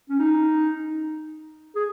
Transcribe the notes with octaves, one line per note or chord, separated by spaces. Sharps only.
C#4
D#4
G#4